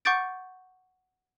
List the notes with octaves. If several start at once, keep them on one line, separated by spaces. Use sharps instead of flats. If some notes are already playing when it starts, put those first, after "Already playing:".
F#5 C#6 D6 G6 A6 D7